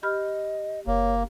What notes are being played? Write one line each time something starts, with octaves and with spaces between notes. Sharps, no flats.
G4 D#5 B5 F6
F#1 A#3 C#5